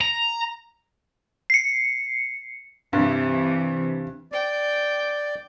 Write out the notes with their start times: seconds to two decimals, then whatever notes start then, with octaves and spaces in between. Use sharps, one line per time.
0.01 A#5
1.50 C7 C#7
2.93 G2 C3 E3
4.32 D5 G5